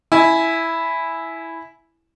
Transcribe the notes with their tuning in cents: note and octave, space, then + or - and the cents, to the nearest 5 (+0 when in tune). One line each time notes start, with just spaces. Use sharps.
E4 +0 G#5 +10